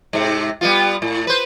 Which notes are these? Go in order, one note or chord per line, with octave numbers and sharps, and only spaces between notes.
G#2 C3
G3 B3 F4
A2
B4 C5